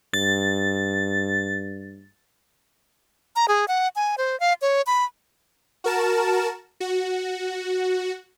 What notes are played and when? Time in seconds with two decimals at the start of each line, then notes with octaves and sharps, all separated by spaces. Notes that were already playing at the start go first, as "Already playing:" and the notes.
0.14 G2 A6
3.36 A#5
3.48 G#4
3.68 F#5
3.96 G#5
4.18 C5
4.40 F5
4.62 C#5
4.87 B5
5.84 F#4 A#4 A5 E7
6.80 F#4